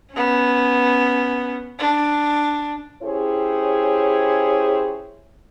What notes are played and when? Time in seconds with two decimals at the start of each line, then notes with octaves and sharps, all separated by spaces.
0.12 B3 C#4
1.79 D4
3.03 C#4 E4 G4 G#4 C5 C#5